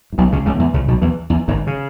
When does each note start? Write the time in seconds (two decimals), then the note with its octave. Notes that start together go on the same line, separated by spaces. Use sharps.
0.13 G#2
0.18 B1 B2
0.32 C#2 C#3
0.46 C#2 C#3
0.59 E2 E3
0.74 C#2 C#3
0.88 B1 B2
1.02 E2 E3
1.30 E2
1.48 G#1 G#2
1.67 C#3